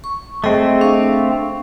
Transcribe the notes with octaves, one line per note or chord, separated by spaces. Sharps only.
C#6
A3 C4 G#4 D#5
D4 F5 C#6